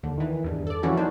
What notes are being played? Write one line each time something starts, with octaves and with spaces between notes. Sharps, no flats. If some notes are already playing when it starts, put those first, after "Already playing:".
D#2 D3
D#3 E3
E2 G2
A4 D5
E3 F3 G3 C#4 E4 F#4
A#3 D4 D#4 C5